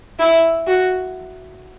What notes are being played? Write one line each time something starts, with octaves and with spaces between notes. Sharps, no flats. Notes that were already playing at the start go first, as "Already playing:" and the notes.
E4
F#4